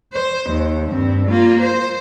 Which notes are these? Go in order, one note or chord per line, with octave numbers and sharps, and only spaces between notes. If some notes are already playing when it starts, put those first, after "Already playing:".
C5
D#2
G2 C4
A#3 F4
C5